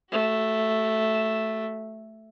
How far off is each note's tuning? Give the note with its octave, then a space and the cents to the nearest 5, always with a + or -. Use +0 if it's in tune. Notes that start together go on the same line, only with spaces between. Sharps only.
A3 +0 F#4 +40